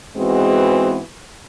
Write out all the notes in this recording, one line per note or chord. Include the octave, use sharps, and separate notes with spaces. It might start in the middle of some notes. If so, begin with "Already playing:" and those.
G#2 E3 G#3 B3 C4 F#4